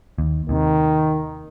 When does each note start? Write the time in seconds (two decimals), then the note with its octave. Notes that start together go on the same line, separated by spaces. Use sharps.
0.18 D#2
0.49 D#2 C3 D#3